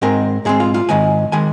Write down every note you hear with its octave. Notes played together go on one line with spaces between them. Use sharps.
G#2 G#3 C4 A#4
G#2 G#3 C4 G#4
F4
F4
G#2 D#3 G#3 G#5
D#3 G#3 G#5